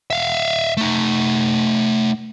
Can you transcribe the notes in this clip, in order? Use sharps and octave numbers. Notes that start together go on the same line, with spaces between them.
E5 F5
A3 D#4